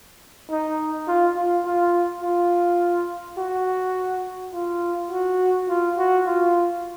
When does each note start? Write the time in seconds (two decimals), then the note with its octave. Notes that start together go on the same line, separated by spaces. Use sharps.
0.50 D#4
1.08 F4
1.36 F4
1.66 F4
2.22 F4
3.38 F#4
4.53 F4
5.11 F#4
5.69 F4
5.98 F#4
6.27 F4